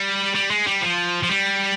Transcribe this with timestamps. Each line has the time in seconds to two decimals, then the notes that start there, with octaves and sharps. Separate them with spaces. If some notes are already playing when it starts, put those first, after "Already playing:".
Already playing: G3
0.35 G3
0.50 G#3
0.67 G3
0.82 F3
1.23 F3
1.29 G3